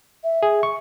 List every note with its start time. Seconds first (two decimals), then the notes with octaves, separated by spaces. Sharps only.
0.24 E5
0.43 G#4
0.63 C#6